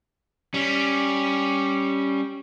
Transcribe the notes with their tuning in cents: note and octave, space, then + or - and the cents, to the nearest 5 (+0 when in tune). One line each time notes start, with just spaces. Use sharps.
G3 +0 C#4 +0